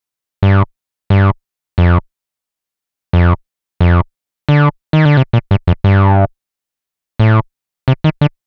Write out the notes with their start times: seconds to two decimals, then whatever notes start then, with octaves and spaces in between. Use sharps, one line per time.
0.43 G2
1.10 G2
1.78 F2
3.13 F2
3.81 F2
4.49 D3
4.93 D#3
5.05 D3
5.17 C3
5.33 A#2
5.51 G2
5.67 F2
5.84 G2
7.20 A2
7.88 C3
8.04 D#3
8.21 D3